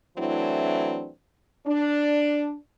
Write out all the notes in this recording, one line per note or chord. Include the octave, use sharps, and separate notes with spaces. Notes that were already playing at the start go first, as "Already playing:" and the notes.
E3 F#3 A3 C4 D4 E4
D4